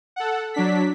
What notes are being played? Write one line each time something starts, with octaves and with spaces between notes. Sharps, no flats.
A4 F#5
F#3 D4 B6